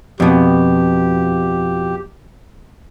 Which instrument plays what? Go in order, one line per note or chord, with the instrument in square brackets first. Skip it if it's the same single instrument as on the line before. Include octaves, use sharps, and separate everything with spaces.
[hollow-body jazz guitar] F2 B2 [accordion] G4